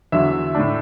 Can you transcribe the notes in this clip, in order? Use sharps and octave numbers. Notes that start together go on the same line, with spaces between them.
E2 D3 F#3 E5
A2 A3 D4